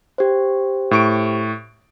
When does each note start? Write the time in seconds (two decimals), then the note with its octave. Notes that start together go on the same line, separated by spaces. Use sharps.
0.18 G4 C5
0.91 A2 C#6 D7